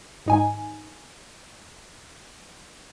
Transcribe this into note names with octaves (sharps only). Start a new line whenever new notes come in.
G#1 D#4 G#5